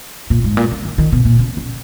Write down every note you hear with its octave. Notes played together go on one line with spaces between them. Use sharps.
A#2
G#2
A#2
C#3
D#3
D#3
B2
A#2
C#3
C#3